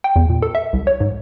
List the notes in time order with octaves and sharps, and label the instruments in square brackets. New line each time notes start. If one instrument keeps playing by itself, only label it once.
[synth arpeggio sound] G5
E2
A#2
A4
E5
C2
C#5
G#2